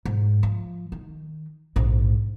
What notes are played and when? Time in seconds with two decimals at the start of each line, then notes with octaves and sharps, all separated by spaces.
0.05 G#2
0.43 F3
0.92 D#3
1.76 A#1 G#2